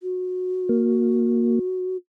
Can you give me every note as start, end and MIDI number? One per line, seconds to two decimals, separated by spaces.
0.03 1.97 66
0.69 1.59 58